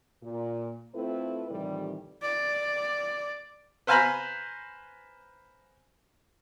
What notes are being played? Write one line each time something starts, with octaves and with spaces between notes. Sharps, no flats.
A#2
A3 C4 E4 F4 A4 B4
F2 A2 C3 D#3 E3 G3
D5
B4 C5 F5 G#5 A#5 B5